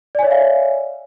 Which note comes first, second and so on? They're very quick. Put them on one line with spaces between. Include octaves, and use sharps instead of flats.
D5 G#5 C#5 E5 F5